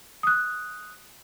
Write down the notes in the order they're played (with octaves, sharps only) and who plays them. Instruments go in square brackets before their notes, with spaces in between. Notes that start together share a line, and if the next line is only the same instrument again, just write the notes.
[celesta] D#6 F#6